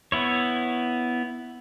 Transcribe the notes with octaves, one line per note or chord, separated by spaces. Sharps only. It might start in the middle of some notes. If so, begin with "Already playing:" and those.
B3 E4 C#5